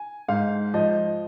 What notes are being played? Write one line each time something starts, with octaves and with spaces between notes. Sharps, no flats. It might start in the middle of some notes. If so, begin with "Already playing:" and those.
Already playing: G#5
G#2 F5
F3 D#5